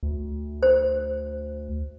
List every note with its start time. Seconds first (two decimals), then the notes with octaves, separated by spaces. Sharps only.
0.03 D2
0.63 C5